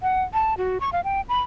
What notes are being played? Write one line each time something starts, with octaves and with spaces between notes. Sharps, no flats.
F#5
A5
F#4
C#6
F5
G5
B5